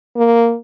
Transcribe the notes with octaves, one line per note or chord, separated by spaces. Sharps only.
A#3